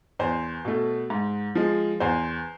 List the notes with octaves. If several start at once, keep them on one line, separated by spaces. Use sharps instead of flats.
E2 C5
B2 A3
G#2
F3 G#3
E2 C5